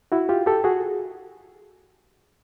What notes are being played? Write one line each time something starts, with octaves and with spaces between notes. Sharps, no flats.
E4 F#4
F4 G4
G4 A4
F#4 G#4